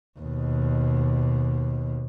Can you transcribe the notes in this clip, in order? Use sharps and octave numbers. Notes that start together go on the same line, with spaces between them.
D#2 B2